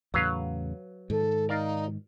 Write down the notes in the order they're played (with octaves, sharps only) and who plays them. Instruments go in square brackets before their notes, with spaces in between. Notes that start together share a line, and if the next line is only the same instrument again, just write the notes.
[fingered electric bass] E2 A2 C#3 [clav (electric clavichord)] F#3 B4 F5
[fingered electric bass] G#2 D#3 [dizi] A4
[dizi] D#4 [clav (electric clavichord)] A#4 D5 F5